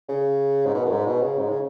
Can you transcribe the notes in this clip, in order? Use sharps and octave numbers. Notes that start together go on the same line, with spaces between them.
C#3
G#2
B2
F#2
G#2
B2
C#3
G#2
C#3